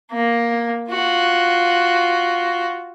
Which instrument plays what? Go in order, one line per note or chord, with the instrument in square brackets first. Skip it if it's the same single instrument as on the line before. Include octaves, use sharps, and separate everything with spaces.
[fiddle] A#3
F4 F#4